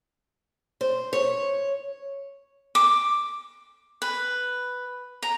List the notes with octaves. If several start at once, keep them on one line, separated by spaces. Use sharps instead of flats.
C5
C#5
D6
B4
A#5